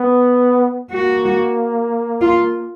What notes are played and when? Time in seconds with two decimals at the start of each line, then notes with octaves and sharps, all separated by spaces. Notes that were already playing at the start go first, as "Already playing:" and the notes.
Already playing: B3
0.91 A#3 F#4
2.21 F4